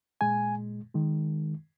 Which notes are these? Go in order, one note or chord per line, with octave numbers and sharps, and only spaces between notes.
A#2 G#3 G#5
D#3 G#3